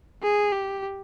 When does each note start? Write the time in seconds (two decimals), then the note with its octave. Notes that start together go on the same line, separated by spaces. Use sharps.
0.23 G#4
0.52 G4